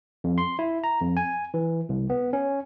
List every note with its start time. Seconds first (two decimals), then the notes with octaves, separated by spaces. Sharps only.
0.24 F2
0.38 C6
0.59 E4
0.84 A#5
1.01 F2
1.17 G#5
1.54 E3
1.89 C2
2.10 B3
2.33 C#4